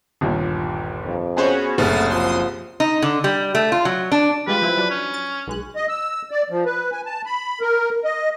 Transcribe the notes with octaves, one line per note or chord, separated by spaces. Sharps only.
G1 D#2 A#2
F2
B3 C#4 F#4 G#4 C5 C#5
F#1 C2 A3 D#6 F6 A6
F3 C6 D#6
D#4
D3
G3
A3
F4
F#3
D4
G3 G#3 F4 B4
F3 C4 E4
F#3 D4
C#4
A6
B1 G#3 F#6
D#5
E6
D5
F3
B4
G#5
A5
B5
A#4
D#5